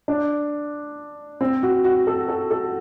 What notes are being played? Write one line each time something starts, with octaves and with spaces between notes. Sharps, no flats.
D4
C4
F#4
F#4
A4
A4
A4